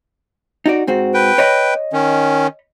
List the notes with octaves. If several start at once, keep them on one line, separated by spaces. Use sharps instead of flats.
D#4 F#4 D5
G#2 C4 F#4
B4 G5
C#5 D#5 B5
D#3 C#4